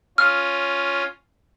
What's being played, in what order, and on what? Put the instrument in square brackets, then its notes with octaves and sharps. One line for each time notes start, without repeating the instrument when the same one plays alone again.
[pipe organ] C#4 F4 [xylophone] F6